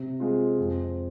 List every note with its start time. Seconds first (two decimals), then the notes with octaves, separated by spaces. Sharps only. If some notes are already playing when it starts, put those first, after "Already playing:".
Already playing: C3
0.20 G#3 C4 F4
0.58 F2